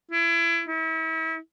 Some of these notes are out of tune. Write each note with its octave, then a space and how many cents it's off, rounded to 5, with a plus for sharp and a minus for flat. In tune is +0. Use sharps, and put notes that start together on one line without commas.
E4 +30
E4 -35